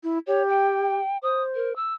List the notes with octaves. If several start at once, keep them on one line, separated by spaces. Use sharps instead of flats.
E4
G4 C#5
G5
C5 D#6
A#4
E6